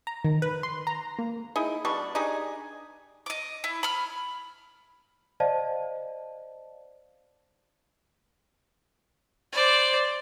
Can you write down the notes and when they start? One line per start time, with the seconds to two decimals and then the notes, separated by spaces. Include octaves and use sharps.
0.07 A#5
0.25 D#3
0.42 B4
0.63 C6
0.87 A#5
1.19 A#3
1.56 D#4 E4 G#4
1.85 B2 G3 D4 C#6
2.15 D4 D#4 G4 G#4
3.26 D#5 D6
3.64 E4
3.83 B5 F6
5.40 C5 D5 D#5 F5 A5
9.52 C5 D5